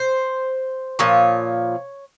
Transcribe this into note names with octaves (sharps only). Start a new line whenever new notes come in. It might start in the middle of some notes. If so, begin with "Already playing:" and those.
Already playing: C5
A#2 F3 C#5